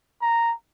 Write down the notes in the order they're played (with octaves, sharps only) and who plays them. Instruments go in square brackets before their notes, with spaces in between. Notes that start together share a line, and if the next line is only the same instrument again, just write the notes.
[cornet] A#5